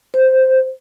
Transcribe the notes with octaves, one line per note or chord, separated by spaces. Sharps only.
C5